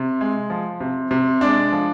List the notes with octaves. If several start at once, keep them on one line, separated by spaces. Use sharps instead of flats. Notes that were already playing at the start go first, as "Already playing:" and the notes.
Already playing: C3
G#3
F3
C3
C3
G#3 D4 D5
F3